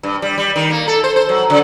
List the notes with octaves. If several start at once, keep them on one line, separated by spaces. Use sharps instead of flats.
G2
G3
G3
D#3
A#3
A4
C5
C5
F#3
C#3